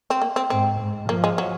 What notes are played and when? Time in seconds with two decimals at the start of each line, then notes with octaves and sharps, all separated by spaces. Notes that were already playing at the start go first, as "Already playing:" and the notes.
0.10 C4
0.22 A#3
0.36 C4
0.50 G#2 C4
0.80 G#2
1.09 F3 A#3
1.24 G#3
1.38 F#3